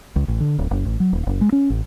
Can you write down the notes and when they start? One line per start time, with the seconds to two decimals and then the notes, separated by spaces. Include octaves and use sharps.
0.16 C#2
0.28 A1
0.41 D3
0.59 D1
0.71 F#1
0.85 A1
1.00 F#3
1.13 D#1
1.27 F#1
1.41 G#3
1.52 C#4
1.70 A1